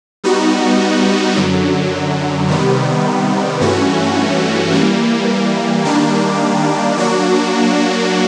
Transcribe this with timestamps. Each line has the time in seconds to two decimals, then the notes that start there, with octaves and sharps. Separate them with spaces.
0.24 G3 B3 D#4 F#4
1.36 F#2 D3 F#3
2.48 C3 D#3 G3 B3
3.61 G2 E3 A3 C#4 F#4
4.72 E3 G3 A#3
5.85 D#3 G3 A#3 D4
6.98 F#3 A#3 D4 F#4